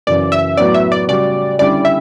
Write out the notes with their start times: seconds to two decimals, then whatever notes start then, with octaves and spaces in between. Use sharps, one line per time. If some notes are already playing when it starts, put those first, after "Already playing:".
0.07 F#2 C#3 E3 D5
0.32 E5
0.57 A2 F#3 B3 F#4 D5
0.74 E5
0.92 D5
1.08 C#3 G3 C#4 F#4 D5
1.59 D3 G3 C#4 E4 D5
1.85 E5